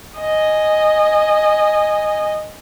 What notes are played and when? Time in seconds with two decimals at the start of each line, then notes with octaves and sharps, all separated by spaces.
0.18 D#5 G#5